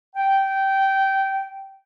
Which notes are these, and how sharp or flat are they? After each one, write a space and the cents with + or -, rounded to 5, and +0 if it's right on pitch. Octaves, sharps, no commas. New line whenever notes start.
G5 -15